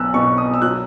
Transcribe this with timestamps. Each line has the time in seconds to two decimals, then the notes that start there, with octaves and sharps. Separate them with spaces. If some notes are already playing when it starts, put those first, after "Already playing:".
Already playing: B1 B3 E6 F#6
0.14 B2 C#6
0.38 D#6
0.54 E6
0.62 F#3 F#6